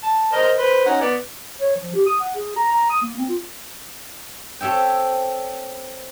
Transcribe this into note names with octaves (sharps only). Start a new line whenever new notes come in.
A5
A#4 C5 D#5
B4 C5
C#4 D#4 F#5
B3 D5
C#5
F3
G4
D#6
F#5
G#4
A#5
A#5
D#6
A#3
C4
F4
C4 A4 C#5 E5 G5